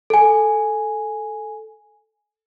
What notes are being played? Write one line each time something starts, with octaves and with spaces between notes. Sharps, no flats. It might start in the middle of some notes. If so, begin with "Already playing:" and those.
A4 G#5